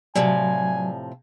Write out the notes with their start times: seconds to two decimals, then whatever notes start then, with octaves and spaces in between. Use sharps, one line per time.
0.15 A2 C3 F3 F#3 D5 G#5